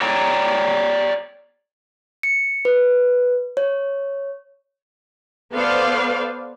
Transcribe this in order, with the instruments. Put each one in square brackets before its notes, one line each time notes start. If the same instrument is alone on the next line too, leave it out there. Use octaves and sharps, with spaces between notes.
[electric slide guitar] C#5 D5 G5 A#5
[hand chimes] C#7
B4
C#5
[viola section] B3 A4 B4 C5 D5 F5